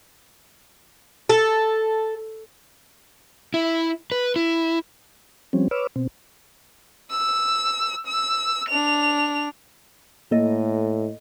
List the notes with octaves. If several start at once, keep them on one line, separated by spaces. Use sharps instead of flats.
A4
E4
B4
E4
F3 G3 C4 C#4
B4 C#5 D6 E6 F6
B2 C4
E6
E6
D4 F7
A2 A#3 A4 D#5